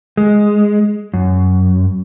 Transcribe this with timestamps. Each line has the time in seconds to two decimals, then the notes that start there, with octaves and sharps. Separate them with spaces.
0.17 G#3
1.14 F#2